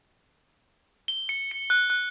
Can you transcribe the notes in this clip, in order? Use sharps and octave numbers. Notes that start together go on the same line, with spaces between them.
G7
C#7
C#7
F#6
F#6